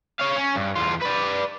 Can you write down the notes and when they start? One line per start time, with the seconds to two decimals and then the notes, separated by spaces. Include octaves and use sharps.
0.20 C#5 F5
0.36 C#4
0.56 G2
0.75 E2 F4
1.01 B4 D5